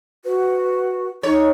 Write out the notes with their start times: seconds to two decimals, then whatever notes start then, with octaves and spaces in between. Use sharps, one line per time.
0.25 F#4 B4
1.23 D#4 C#5